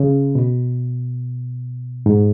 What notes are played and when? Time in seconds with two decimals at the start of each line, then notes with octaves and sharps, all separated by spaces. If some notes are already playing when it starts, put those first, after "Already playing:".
Already playing: C#3
0.35 B2
2.06 G#2